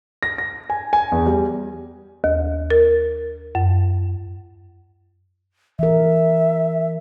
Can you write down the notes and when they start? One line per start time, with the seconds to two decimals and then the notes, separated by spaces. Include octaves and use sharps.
0.23 A#6
0.38 A#6
0.70 G#5
0.93 G#5
1.12 E2
1.26 G3
2.24 D#2
2.70 A#4
3.55 F#2
5.79 E3 A#4 E5